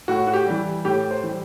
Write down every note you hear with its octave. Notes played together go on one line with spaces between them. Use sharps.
A2 F#4
F#4
G4
E3 G3
A2 G4
C5
E3 G3